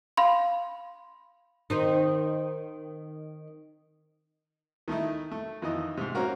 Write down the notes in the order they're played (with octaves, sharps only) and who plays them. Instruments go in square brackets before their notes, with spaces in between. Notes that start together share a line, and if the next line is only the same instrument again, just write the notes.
[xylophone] F5 B5 C6
[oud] D#3 C4 D#4
[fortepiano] D#3 A3 D#4 E4
A3
F2 D#3 E3 D#5 D#6
G#2 C3
A#3 C4 C#4 F#4 A#4